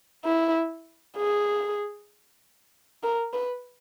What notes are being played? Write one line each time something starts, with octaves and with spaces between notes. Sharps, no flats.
E4
G#4
A#4
B4